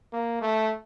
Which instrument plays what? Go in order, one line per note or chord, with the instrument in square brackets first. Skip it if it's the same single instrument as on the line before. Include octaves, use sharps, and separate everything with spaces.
[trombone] A#3
A3